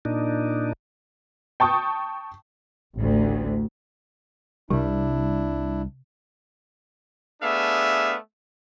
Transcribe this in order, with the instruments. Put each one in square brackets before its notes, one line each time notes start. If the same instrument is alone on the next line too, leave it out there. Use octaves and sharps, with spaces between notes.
[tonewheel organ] A#2 D4 D#4
[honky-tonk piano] G5 A5 C#6 D#6
[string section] A1 D2
[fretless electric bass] C2 G3 [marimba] C3 [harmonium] D4 E4
[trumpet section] A3 B3 D4 G#4 E5 F5